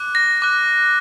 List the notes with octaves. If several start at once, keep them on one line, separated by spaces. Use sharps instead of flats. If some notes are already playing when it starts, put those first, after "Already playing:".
Already playing: D6 F#6
A#6
D6 F#6